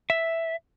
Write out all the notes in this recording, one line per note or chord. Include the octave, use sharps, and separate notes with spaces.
E5